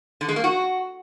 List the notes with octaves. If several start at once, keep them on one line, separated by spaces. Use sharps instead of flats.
D3
G#3
A#3
F#4